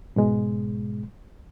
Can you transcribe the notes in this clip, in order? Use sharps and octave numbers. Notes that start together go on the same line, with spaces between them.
G#2 B2 G#3